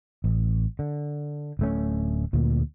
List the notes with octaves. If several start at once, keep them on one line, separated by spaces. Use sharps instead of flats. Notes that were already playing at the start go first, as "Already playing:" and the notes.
A1
D3
D1 A3 C#4
D2 A#2